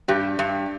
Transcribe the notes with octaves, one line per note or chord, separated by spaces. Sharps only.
G2 G4
G2